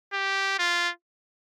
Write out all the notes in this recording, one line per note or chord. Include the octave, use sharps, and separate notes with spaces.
G4
F4